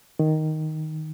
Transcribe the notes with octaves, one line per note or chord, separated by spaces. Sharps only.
D#3